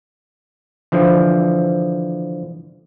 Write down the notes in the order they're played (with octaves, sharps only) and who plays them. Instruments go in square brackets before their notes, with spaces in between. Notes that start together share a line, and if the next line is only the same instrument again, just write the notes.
[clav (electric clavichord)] D3 E3 F3